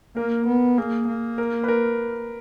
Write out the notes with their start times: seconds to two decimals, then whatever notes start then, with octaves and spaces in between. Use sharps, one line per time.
0.17 A#3 A#4
0.47 B3
0.78 A#3 G#4
1.08 A#3
1.38 A#4
1.64 B4
1.68 A#4